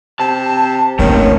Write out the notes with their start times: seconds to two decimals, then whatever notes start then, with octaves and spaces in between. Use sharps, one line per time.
0.20 C3 A5
0.99 F#1 D#3 A3 A#3 C4 C#5